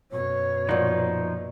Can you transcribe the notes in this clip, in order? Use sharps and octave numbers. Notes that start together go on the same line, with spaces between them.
F#2 B2 C#5
A#2 F3 D#4 F#5